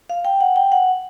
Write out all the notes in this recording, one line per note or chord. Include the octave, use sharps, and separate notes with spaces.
F5
G5
F#5
G5
F#5